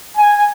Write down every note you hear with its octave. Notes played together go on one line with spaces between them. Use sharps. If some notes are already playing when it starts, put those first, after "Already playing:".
G#5